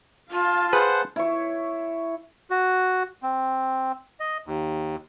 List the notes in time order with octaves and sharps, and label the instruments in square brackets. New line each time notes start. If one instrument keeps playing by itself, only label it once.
[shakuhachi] F4 [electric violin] F5 A5
[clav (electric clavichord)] G#4 B4 [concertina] C5 F#5
[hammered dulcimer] E4 C#5
[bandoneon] F#4
C4
D#5
D#2